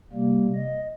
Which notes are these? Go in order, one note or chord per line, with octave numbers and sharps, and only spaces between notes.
C3 G3 A#3
D#5